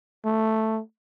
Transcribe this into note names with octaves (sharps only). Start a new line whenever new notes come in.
A3